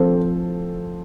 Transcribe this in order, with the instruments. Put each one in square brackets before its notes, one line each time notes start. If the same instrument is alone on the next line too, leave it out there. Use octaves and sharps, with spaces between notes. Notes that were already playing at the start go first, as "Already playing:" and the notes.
Already playing: [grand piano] F3 C4 A4 C5